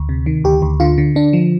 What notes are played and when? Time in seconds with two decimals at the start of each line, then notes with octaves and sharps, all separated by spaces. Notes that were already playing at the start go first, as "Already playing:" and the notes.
Already playing: D2
0.09 C3
0.26 D#3
0.44 D2 G4
0.62 D2
0.80 D3 F4
0.98 D3
1.15 D3 D4
1.33 F3